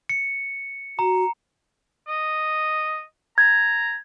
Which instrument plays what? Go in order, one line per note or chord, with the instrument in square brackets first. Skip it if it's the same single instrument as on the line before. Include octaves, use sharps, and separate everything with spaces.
[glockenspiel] C#7
[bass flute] F#4 [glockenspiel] A#5
[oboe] D#5
[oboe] A#5 [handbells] G#6